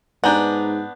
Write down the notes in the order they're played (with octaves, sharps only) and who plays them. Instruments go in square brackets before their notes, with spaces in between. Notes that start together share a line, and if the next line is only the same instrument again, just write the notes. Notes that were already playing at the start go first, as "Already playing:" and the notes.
[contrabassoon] G#2 [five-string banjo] B3 D4 [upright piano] G#5 A#5 G6